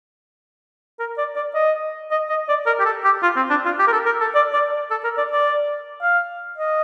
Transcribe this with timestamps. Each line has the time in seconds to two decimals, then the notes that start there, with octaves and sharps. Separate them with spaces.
0.99 A#4
1.18 D5
1.36 D5
1.55 D#5
2.11 D#5
2.30 D#5
2.49 D5
2.66 A#4
2.80 G4
2.85 A4
3.04 G4
3.23 F4
3.36 C4
3.50 D4
3.65 F4
3.79 G4
3.88 A#4
3.93 A4
4.06 A#4
4.21 A4
4.35 D5
4.53 D5
4.91 A4
5.04 A#4
5.18 D5
5.32 D5
6.02 F5
6.58 D#5